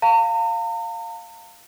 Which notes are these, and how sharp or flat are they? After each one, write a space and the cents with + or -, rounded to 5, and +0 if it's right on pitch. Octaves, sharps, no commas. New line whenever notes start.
F5 +0 A#5 -45